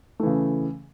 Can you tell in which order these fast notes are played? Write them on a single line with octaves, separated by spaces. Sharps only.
A3 E3 C#3